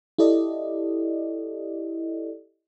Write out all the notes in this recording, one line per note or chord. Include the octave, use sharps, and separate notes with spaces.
E4 G4 A4 D5 D#5